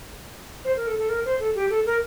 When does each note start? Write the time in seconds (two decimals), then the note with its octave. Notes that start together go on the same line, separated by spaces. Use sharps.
0.65 C5
0.76 A#4
0.87 A4
0.99 A4
1.09 A#4
1.25 C5
1.40 A4
1.55 G4
1.70 A4
1.86 A#4